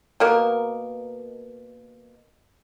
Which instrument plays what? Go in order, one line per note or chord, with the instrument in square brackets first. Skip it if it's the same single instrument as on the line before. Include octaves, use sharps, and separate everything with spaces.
[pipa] B2 A#3 A#4